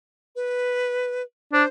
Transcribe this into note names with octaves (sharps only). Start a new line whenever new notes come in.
B4
D4 C5